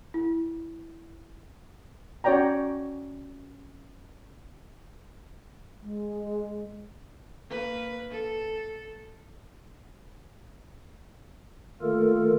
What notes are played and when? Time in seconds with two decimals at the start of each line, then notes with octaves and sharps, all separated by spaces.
0.14 E4
2.24 C#4 F#4 C#5 D5 G5 A#5
5.82 G#3
7.49 A#3 B4
8.11 A4
11.82 D#3 A3 A#3 F4 A4 A#4